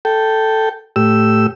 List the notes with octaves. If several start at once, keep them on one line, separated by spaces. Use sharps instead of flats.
A4 G5
A2 G4 E6